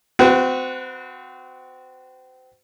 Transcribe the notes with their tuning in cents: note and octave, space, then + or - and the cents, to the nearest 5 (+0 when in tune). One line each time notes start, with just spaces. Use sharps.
C4 -30 F#4 -15 B4 +5